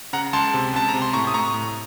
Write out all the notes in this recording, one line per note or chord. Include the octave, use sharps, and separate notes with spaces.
C#3 F#5 A#5
C#2 A5 C6
C3
C#2 A5
C3 A#5
C6
A2 A#5 C#6
D#6
A2 A#5 C#6
A2